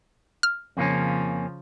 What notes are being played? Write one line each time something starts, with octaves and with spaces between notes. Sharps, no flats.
F6
F2 C#3 F3 A#3 C#4